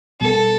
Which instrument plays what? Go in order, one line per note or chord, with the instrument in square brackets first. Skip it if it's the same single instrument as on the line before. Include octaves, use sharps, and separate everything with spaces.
[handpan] B2 G3 B3 [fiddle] A4